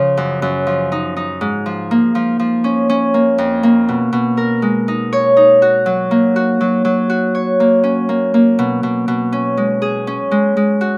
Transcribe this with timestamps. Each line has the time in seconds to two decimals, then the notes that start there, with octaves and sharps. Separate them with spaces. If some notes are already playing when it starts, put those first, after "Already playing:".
Already playing: C#3 F3
0.17 F#2
0.42 F#2
0.67 F3
0.92 D#4
1.17 D#4
1.41 G#2
1.66 F3
1.91 A#3
2.15 F3
2.39 F3
2.64 C#4
2.90 C#4
3.14 A#3
3.38 F2
3.63 A#3
3.89 B2
4.13 B2
4.37 A#4
4.62 G#3
4.88 D#4
5.13 C#5
5.37 D#4
5.62 F#4
5.86 F#3
6.11 A#3
6.36 F#4
6.61 F#3
6.85 F#3
7.10 F#4
7.35 C#5
7.60 A#3
7.84 C#4
8.09 A#3
8.34 A#3
8.59 B2
8.83 B2
9.08 B2
9.33 C#4
9.57 G#3
9.82 G#4
10.07 C#4
10.31 G#3
10.57 G#3
10.81 F#4